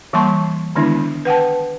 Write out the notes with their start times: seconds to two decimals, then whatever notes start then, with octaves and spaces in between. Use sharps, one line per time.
0.13 E3 G3 A#3 A5 C6 C#6
0.76 D3 D#3 G#3 B3 D4 E4
1.25 B4 F#5 G5 A5